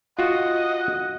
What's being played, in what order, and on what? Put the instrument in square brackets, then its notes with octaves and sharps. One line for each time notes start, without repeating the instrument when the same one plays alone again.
[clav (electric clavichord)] F4 F#4 [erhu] D#5 [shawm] F#5